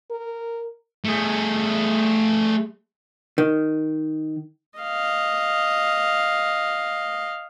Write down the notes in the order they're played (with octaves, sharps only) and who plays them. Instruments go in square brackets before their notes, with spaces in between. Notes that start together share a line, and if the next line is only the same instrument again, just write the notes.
[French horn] A#4
[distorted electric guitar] A3 G#4
[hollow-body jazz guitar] D#3
[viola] D#5 F5